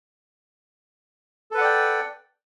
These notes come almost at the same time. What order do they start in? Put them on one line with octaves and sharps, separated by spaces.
A4 B4 F#5 D5 G5